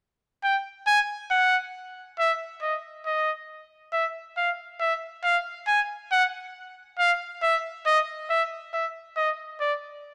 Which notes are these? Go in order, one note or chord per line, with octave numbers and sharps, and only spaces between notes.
G5
G#5
F#5
E5
D#5
D#5
E5
F5
E5
F5
G#5
F#5
F5
E5
D#5
E5
E5
D#5
D5